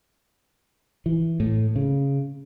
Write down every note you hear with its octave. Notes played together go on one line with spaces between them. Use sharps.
E3
A2
C#3